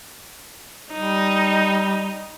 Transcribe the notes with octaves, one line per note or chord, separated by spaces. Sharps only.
G3 D#4